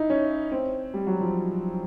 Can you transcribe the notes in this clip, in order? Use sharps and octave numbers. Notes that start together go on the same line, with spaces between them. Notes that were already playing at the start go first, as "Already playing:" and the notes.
Already playing: D#4 E4
C#4
C4
G3
F#3
F3